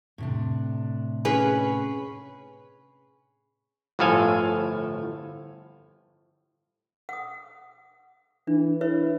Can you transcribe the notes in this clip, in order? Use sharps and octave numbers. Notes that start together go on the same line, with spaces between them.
A2 C3 D4
C#4 G#4 B4
G1 A2 F3 A4 F5 G#5
F#5 D#6
E3 D4
E4 B4 C#5 E5